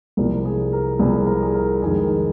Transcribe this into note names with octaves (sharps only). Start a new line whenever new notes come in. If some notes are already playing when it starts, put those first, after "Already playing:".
C2 C3 F3 A#4
G#4
A#4
C2 C3 F3 G#4
A#4
G#4
A#4
F2 D#3 G#3 G#4
A#4